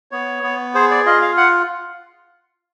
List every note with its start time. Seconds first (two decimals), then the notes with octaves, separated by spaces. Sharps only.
0.11 B3 C#5
0.43 B3
0.74 G#4 C5
0.91 D5
1.06 F4 D#5
1.22 F5
1.37 F#5